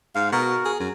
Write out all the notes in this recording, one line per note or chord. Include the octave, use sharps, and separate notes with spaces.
G#2 F5
B2 F#4 A#4
G#4
F#2